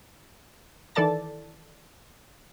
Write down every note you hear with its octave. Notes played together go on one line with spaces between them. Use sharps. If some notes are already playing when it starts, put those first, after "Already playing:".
D#3 E3 A4 D5 A5 A6